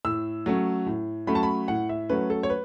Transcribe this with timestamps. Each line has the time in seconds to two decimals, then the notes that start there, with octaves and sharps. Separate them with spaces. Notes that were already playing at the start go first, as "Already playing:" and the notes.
0.05 A2 E6
0.46 F#3 A3 C#4
0.86 A2
1.27 F#3 A3 C#4 B5
1.35 A5
1.43 B5
1.68 A2 F#5
1.89 E5
2.10 F#3 A3 C#4 B4
2.30 A4
2.43 C#5
2.50 B4